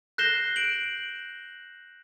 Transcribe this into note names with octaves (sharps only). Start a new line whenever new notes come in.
F#6 G6 A#6 C7 E7 G7
D7 F#7